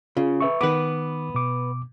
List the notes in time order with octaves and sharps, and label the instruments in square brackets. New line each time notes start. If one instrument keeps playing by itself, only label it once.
[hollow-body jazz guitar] C#3 [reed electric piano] F4
[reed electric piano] B4 E5 C#6
[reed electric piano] D#3 B5 D6 [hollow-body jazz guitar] B3 B4
[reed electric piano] B2 D6